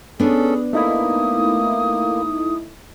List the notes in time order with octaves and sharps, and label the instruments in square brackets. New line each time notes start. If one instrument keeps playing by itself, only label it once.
[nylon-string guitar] B3 D4 [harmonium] C#4 A4 [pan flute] G#4
[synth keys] A3 D#4 E4 [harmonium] A#3 [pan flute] D#6